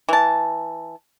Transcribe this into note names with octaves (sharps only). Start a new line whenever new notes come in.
E3 A5